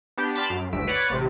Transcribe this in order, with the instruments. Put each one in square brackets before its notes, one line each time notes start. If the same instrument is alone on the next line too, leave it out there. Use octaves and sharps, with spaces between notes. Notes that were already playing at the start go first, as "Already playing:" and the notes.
[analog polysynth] B3 D4 G4
A5 B5 C6 D6 F6
F#2
G1 D2 E6 B6 D7
B4 C#5 D5 F#5 A6
A1 C3